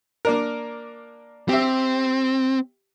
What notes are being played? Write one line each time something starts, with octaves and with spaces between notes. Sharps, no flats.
A#3 D4 A#4
C4 G4 E5